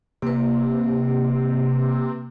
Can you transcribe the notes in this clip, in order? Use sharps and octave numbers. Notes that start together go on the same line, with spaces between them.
C3 A#3 B4